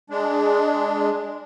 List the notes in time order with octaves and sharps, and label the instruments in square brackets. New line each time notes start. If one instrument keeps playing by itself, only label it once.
[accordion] G#3 D4